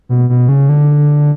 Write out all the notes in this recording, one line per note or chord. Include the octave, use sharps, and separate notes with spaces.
B2
B2
C#3
D3